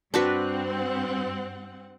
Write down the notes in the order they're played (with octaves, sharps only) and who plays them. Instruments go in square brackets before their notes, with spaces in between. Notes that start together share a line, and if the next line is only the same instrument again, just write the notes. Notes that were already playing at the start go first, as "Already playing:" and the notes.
[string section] G2 C4 F#5 [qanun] D4 F#4 B4